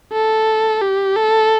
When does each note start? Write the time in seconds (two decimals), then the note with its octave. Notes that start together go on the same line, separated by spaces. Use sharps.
0.13 A4
0.82 G4
1.16 A4